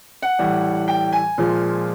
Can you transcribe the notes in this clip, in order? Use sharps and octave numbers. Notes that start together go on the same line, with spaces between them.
F#5
A2 E3 G3
G5
G#5
A#2 F3 G#3